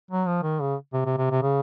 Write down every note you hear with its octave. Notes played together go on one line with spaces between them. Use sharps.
F#3
F3
D#3
C#3
C3
C3
C3
C3
C#3